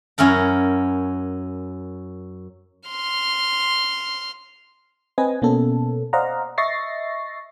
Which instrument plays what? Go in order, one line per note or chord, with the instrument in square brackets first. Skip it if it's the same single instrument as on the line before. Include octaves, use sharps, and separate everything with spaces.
[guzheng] F#2 C#4 E4 A#4 A#5
[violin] C6 F6
[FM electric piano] C4 B4 D#5 G#5
B2 A#3 B3 C#4 A4
C5 D5 D#5 F5 F#5 A#5
D#5 E5 C#6 A6 A#6 C7